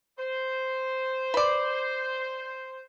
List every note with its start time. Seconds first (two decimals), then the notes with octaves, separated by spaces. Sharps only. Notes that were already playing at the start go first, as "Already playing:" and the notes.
0.18 C5
1.34 B4 D5